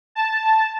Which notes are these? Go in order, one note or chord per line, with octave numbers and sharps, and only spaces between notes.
A5